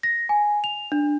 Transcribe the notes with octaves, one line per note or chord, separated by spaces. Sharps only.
A#6
G#5
F7
D4